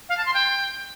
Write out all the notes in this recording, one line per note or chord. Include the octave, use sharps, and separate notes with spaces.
F5
A5
C6
G5